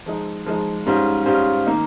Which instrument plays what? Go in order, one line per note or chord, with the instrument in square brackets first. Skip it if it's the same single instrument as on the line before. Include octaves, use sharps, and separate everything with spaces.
[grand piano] F3 G#3 D#4
F3 G#3 D#4
G#2 G3 C#4 F4 C5
G#2 G3 C#4 F4 C5
D#3 A#3 D#4